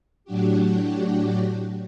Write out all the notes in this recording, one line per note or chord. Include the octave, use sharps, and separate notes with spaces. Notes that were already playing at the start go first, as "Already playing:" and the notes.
A2 F#3 D4 F#4 G4